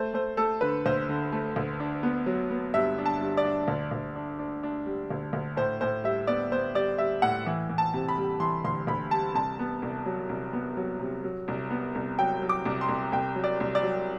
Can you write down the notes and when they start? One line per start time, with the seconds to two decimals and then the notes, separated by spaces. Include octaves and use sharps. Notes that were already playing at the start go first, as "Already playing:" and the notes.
Already playing: A3 C5
0.14 A3 C5
0.37 A3 A4
0.61 D3 B4
0.86 D2 C5
1.09 D3
1.32 A3
1.56 D2
1.80 D4
2.03 B3
2.26 F#3
2.51 B3
2.74 G2 E5
2.98 D4
3.06 A5
3.21 G2
3.37 D5
3.45 D4
3.68 D2
3.91 D2
4.16 D4
4.39 D4
4.63 D4
4.86 G3
5.10 D2
5.33 D2
5.57 A2 C5
5.81 A2 C5
6.04 G3 E5
6.27 B3 D5
6.51 B3 C5
6.75 G3 D5
6.98 G3 E5
7.22 A2 F#5
7.46 E3
7.69 E3
7.78 A5
7.93 C3
8.09 B5
8.17 G3
8.40 E3 C6
8.64 D2 C6
8.87 D2 B5
9.11 G3 A5
9.34 C2 A5
9.59 B3
9.82 C2
10.06 F#3
10.29 C2
10.53 B3
10.77 F#3
11.00 C3
11.24 F#3
11.48 C2
11.70 B3
11.95 C2
12.19 F#3 G5
12.42 F#3
12.49 D6
12.65 C2
12.81 C6
12.89 C2
13.12 C2 G5
13.36 F#3
13.44 D5
13.60 C2
13.75 D5
13.83 F#3